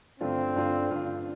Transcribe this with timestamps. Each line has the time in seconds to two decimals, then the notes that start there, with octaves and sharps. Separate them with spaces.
0.20 G2 D3 A3 C4 D4 F4
0.56 G2 D3 A3 D4 F4
0.91 G2 D3 A3 D4 F4